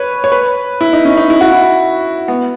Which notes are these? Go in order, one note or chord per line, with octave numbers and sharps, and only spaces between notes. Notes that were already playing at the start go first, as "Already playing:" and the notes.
Already playing: B4 C#5
C#5
B4
E4
D#4
C#4
D#4
E4
F#4
E4
B3